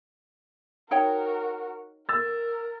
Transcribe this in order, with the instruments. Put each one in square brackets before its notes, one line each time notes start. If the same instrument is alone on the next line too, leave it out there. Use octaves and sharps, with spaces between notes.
[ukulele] D#4 C#5 G5 [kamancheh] F#4 A#4
[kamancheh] A#4 [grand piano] E6 A6